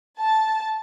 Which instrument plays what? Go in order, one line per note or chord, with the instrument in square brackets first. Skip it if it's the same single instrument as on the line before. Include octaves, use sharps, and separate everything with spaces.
[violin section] A5